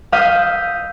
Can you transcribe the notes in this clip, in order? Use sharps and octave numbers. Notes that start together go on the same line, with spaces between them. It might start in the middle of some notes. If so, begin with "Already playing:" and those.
F5 D#6 E6 G6 B6